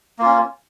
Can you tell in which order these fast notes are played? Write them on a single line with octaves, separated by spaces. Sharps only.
A#3 F4 C#4